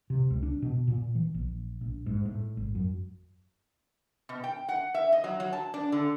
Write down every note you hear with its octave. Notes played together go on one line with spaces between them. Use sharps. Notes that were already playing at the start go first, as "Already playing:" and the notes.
C3
C#2
D4
B2
A#2
E3
A#1
A#1
G#2
A2
G#1
F#2
B2
G5
F#5
E5
D#5
F#3
F#3
A5
D4
D3